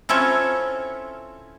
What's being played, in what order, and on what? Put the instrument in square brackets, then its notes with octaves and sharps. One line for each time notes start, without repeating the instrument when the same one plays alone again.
[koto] C4 C#4 E4 F4 A4 C#5